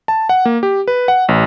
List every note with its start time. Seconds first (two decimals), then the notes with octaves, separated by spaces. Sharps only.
0.08 A5
0.29 F#5
0.45 A#3
0.63 G4
0.88 B4
1.08 F#5
1.28 A1